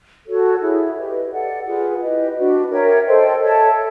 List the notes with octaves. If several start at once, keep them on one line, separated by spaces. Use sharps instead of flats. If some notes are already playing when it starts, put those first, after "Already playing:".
F#4 A4 C#5
E4 G#4 C#5
G4 B4 D#5
A4 D5 F#5
F4 G#4 B4
E4 G4 B4 D#5
D4 F#4 B4 D5
A#4 C#5 E5 G5
A4 C5 D#5 G5
A4 C#5 E5 A5